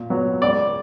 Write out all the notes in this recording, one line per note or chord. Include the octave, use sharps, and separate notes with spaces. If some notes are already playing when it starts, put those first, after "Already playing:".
Already playing: A#2
F#3 B3
C#2 D5